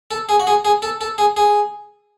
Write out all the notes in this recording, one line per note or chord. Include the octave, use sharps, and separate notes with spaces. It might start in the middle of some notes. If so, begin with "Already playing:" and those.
A4
G#4
F#4
G#4
G#4
A4
A4
G#4
G#4